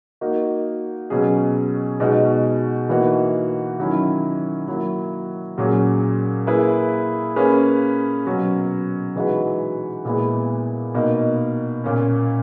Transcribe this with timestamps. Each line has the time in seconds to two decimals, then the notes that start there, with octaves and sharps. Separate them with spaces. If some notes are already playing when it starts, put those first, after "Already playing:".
0.21 A#3 D#4 F#4 A#4
1.10 B2 F#3 C#4 G#4
2.00 B2 G#3 D#4 F#4
2.89 E3 A#3 D#4 F#4
3.79 D#3 F#3 C#4 E4
4.68 F#3 A#3 E4
5.58 A#2 F#3 C#4 G#4
6.47 A#3 E4 G#4 B4
7.36 A#3 C#4 G#4 B4
8.27 B2 F#3 C#4
9.16 E3 G#3 D#4 F#4 B4
10.05 A#2 G#3 B3 E4
10.94 B2 A#3 D#4
11.84 A#2 A#3 C#4